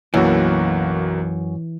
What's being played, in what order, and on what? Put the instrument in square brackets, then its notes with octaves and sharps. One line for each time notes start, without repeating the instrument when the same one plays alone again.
[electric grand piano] B1 A#3 F#4 [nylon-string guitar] F#2 [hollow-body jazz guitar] E3